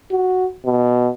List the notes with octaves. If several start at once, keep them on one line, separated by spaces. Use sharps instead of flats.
F#4
B2